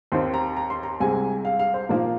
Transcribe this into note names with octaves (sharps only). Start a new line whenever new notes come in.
D#2 D#3 C4 D#4 C6
A#5
A#5
C6
A#5
C2 C3 G#3 G#5
F5
F5
C5
A#2 F3 A#3 D#4 A#4